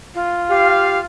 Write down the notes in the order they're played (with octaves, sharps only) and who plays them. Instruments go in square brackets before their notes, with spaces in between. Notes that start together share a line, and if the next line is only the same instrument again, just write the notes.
[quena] F4
[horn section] G4 F5